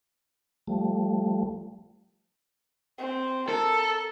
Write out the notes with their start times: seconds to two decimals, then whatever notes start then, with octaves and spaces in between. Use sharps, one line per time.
0.67 F3 G3 A3
2.98 C4
3.49 A4 A#4